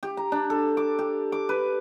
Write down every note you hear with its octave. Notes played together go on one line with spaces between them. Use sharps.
G4
A#5
D4
A4
D6
G4
D6
B4